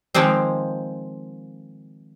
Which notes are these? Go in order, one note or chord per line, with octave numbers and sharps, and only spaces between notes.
D#3 F3 G#3 A#3 C4